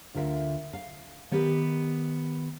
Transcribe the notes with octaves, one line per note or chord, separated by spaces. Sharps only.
D2 D3 F4 A#4 E5
F5
D#3 B3 G4 A#4